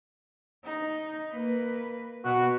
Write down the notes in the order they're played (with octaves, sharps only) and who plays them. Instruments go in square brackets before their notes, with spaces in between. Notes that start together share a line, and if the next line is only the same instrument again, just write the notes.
[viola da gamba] D#4
A#3 B4
[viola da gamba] B2 [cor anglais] F#4